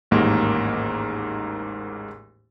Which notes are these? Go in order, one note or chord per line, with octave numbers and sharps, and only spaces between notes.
A1 D#2 G#2 A#3 A#4